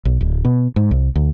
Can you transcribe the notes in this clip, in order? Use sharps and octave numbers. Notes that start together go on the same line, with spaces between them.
B1
D1
B2
G#2
C2
D2